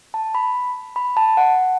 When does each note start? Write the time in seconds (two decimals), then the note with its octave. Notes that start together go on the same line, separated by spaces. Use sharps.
0.14 A5
0.35 B5
0.96 B5
1.17 A5
1.37 F#5